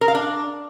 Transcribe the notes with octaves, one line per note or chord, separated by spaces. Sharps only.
A#4
F5
D4